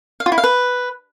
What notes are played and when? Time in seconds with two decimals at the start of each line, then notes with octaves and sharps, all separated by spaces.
0.20 F5
0.26 F4
0.32 E4
0.38 F5
0.44 B4